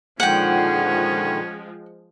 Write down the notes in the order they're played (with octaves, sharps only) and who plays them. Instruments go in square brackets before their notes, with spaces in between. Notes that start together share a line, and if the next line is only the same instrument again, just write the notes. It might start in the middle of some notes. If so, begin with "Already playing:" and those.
[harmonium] A#2 D3 D#3 [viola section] F3 G#3 [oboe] C#4 [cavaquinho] F#5 G5